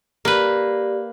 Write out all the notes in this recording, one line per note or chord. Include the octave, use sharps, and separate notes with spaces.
A#3 G4 B4 D5